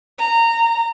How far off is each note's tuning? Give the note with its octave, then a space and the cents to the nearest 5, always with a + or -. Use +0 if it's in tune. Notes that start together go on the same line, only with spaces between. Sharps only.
A#5 -20